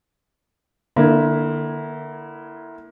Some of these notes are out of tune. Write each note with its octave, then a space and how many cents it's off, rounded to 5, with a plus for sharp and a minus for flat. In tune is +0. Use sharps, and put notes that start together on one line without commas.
D3 +35 A#3 +20 E4 +0